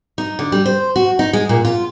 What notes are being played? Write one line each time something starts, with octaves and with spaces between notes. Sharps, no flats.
D#4
D3
G3
C5
F#4
D#4
G#3
A#2
F4